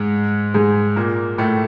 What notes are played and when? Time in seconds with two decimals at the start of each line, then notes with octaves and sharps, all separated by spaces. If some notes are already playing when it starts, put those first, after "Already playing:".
Already playing: G#2 G#3
0.54 G#2 G#3
0.96 A#2 A#3
1.38 A2 A3